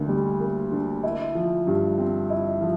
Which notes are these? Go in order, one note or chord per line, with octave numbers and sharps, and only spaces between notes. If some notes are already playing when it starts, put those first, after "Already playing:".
Already playing: D2 D3 A#3
G3
A#3
D3
E4
F3
G2
C4
E4
F3